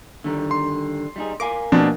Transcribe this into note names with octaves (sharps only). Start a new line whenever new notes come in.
D3 D#3 G3
C6
G3 D#4 G#4
A#4 F5 G#5 D6
B2 F3 A#3 C4 D4